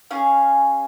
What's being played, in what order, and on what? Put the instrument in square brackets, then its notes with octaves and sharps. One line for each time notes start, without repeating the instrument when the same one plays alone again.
[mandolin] C#4 F4 G#4 F5